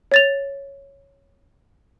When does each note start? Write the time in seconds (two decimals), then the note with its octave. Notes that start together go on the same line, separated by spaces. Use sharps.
0.11 C#5 A6 F7